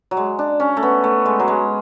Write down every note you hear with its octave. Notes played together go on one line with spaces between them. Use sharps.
F#3
G#3
D4
C#4
A3
B3
A3
G#3
F#3
G#3